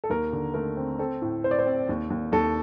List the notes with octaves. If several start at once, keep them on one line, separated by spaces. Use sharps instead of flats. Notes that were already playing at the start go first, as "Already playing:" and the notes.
A4
D#2 A#4
D3
A3 A#4
C4
C4 A4
A2
C4 C5
D5
C5
C4
D#2
D#2
D#2 A4